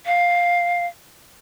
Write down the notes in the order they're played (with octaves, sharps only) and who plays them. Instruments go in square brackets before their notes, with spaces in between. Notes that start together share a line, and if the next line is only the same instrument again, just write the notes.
[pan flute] F5